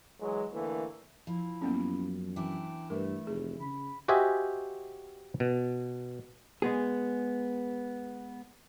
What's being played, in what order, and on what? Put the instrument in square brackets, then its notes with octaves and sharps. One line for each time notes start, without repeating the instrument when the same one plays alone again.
[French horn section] E3 F#3 G#3
D3 E3 A3 A#3
[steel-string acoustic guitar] F3 [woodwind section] E4
[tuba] F#2 [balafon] A#3 B3 C#4
[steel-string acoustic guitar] E3 E4 [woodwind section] D4 G5 D6
[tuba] G2 [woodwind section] A3 [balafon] A#4 B4
[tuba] F1 [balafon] G#4
[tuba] C#3 [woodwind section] B5
[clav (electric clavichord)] F#4 G4 C5 D#5 E5 G#5
B2
[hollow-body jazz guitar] G#3 B3 G#4